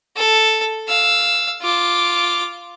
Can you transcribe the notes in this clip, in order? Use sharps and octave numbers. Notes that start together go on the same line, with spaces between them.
A4
F5 E6
F4 D6